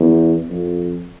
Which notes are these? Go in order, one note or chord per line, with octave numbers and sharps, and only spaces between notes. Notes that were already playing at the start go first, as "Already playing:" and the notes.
Already playing: E2
F2